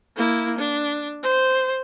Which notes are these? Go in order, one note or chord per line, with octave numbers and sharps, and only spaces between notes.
A#3 E4
D4
C5